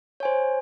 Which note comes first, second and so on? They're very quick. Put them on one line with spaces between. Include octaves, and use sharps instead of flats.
C#5 G#5 C5